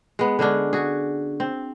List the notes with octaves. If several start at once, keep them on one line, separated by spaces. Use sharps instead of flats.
G#3 B3
D3 G#3 C#4 D4
F#4 G#4
C4